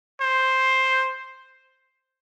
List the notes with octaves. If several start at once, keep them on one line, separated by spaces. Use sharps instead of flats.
C5